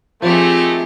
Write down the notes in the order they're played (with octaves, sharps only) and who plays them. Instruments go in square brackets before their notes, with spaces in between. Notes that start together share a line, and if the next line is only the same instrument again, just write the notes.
[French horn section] D#3 A3 [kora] F3 [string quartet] C4 G4 G#4